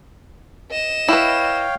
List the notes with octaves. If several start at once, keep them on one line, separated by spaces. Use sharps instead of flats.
D#5 E7
E4 B4 C#5 F5 G5